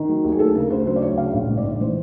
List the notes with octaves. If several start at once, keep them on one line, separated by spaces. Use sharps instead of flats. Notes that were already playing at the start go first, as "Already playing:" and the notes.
Already playing: D#3
F#3
D#2
G#4
D2 A4
C#3 A#4
D2 C5
F#3 C5
D5
D2 C#5
C#3 F5
A#1
G#2
D5
A#1
E3 C5